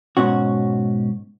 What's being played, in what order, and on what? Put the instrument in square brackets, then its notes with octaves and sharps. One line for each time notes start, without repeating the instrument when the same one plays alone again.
[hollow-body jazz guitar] G#2 B2 C#4 F#4